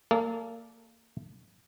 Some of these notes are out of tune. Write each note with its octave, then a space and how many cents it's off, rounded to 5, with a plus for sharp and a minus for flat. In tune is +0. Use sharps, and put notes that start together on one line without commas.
A#3 -25 A4 -35 D5 +0